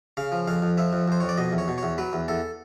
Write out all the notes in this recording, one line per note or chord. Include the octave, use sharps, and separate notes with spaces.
C#3 F5
F3
F2 F5
F2
F3 E5
F2
F2 C5
F2 C#5
D5
B2 D#5
E2
C#5
B2
E2 C#5
F#3 B4
E2
E2 A4